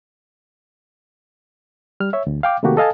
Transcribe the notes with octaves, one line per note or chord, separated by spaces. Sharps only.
G3 F6
C#5 E5
D2
F5 G5 D6
C3 D#3 A3 A#3 F#4 G4
A4 D#5 F5 G#5 A5